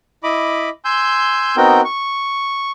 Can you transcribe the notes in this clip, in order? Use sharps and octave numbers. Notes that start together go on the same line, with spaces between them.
E4 D#5 B5 D6
G#5 C6 E6 G6
B3 C4 D#4 F#4 A#4 G5
C#6